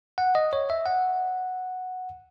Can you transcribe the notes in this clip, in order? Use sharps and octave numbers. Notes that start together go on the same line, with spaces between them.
F#5
D#5
C#5
E5
F#5